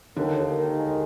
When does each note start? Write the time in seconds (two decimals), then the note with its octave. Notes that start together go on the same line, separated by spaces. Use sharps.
0.16 D#2 D3
0.37 D#2
0.57 D#3
0.78 G#3